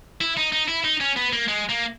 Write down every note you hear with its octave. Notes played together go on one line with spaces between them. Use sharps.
E4
D#4
D#4
E4
D#4
C#4
B3
A#3
G#3
A#3